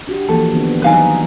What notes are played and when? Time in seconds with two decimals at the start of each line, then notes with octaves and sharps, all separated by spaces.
0.07 D4 F#4 G4
0.29 E3 F3 A#3 A4
0.53 D#3 B3 D4
0.82 E3 F#3 D#4 B4 F5 G#5